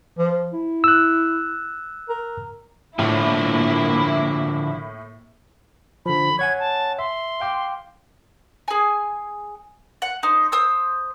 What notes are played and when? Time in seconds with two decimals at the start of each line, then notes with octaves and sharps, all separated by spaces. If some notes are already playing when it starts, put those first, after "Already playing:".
0.18 F3
0.53 E4
0.84 E6 F#6
2.09 A#4
2.99 A2 D3 F3 A#3 E4
6.06 D3 F3 B5
6.39 C#5 F#5 G#5 G#6
6.60 A5
6.99 E5 C6
7.40 F5 G5 D6
8.68 G#4 G#5
10.02 F#5
10.23 D#4 C5
10.52 C5 D#6 E6